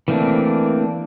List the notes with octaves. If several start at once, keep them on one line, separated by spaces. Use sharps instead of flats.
E3 A3 A#3 C4 D4